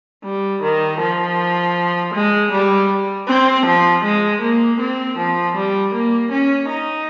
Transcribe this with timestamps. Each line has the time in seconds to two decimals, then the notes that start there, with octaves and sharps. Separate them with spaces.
0.24 G3
0.62 D#3
1.00 F3
2.14 G#3
2.51 G3
3.27 C4
3.66 F3
4.04 G#3
4.41 A#3
4.80 C4
5.18 F3
5.55 G3
5.93 A#3
6.31 C#4
6.69 D#4